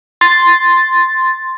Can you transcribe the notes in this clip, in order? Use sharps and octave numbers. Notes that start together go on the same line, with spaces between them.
C6 A6